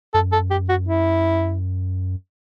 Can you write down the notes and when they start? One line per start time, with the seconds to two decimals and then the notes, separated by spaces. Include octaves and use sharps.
0.14 F#2 A4
0.33 A4
0.51 G4
0.69 F#4
0.88 E4